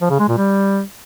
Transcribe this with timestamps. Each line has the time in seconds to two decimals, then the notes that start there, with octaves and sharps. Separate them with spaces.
0.01 F3
0.10 C#3
0.19 G#3
0.29 A#2
0.38 G3